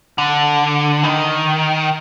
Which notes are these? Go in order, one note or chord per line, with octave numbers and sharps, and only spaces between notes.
D3
D#3